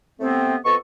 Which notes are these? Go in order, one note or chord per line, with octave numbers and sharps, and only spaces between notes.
C3 A3 B3 C4
F2 B3 A4 D#5 C#6